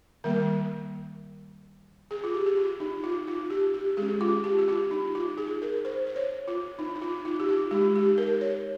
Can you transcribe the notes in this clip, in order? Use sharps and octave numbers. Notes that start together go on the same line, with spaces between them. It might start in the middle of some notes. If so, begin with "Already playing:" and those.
D#3 G3 A#3 A#4
G#4
F4
G4
G4
F4
D#4
F4
F4
G4
G4
G#3 C#4 G#4
F4
G4
G4
F4
D#4
F4
G#4
A#4
C5
C5
C#5
F4
D#4
D#4
F4
F4
G4
F4
G#3 D#4 G4
G4
A#4
C#5